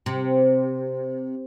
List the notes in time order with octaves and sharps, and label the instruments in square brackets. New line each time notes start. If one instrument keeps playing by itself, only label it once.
[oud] C3